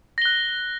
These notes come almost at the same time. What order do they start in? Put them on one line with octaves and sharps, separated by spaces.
A#6 G7 F#6